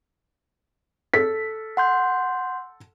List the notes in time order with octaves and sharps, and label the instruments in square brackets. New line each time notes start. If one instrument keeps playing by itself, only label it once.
[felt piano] A4 B6
[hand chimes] F#5 C6 G6